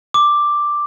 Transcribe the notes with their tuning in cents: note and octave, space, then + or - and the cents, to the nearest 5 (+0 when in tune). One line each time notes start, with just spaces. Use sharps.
D6 +5